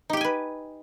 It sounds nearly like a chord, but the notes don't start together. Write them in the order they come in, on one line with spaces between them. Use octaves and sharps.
D#4 G4 G5 G#5 B4